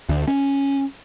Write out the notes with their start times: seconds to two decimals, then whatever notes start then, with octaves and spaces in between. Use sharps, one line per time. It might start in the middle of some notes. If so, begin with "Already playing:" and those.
0.09 D2
0.28 C#4